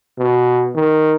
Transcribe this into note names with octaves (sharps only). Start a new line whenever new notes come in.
B2
D#3